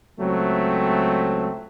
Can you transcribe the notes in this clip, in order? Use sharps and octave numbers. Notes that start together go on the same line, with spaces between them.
C#2 F#3 A3 C4